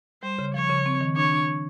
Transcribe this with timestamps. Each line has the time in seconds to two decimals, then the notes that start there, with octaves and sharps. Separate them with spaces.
0.23 G3 C5
0.39 C#3
0.54 F3 C#5
0.70 C#3
0.86 C4
1.01 D#3
1.16 D4 C#5
1.32 D4